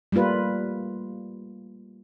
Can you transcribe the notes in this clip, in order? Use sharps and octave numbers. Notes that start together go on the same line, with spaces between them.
G3 A3 A#3 F4 B4